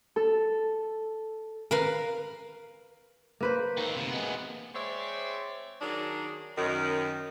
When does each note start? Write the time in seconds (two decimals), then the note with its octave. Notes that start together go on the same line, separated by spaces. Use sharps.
0.16 A4
1.71 A#4 B4 F5
3.41 A#3 B4 C5
3.77 D#3 C4
3.96 D2 C3
4.10 G#3 B3
4.75 G#3 C4 C#5 D5 E5
5.81 D#3 F#3 D4 G#4
6.57 F#2 D#3